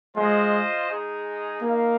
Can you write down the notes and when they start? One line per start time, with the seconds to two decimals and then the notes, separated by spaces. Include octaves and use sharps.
0.16 G#3 F4 C5 D#5
0.89 G#3 D#4 G#4
1.61 A#3 D#4 A#4 F5